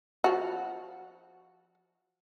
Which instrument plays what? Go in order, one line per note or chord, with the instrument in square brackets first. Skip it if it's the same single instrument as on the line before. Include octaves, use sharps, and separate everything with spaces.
[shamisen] F3 F#4